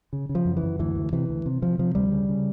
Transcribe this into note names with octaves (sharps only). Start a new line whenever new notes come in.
C#3
C#3
F3
F#2
E3
F#2
D2 E3
D2
C3 E3
D2
C3
C3 F3
C3 F3
D2 G3
C#3
C#3